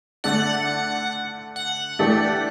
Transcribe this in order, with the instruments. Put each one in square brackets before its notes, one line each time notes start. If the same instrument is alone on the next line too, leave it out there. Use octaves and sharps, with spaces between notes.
[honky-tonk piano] D3 A3 D4 [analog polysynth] F#5
[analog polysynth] F#5
[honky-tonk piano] E3 A3 D4 G4